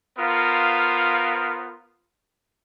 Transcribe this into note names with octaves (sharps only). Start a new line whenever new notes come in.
B3 F4 A#4 C5 F5